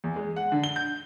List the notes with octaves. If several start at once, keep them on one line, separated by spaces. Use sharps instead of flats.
E2
G#3
F#5
D3
G7
G6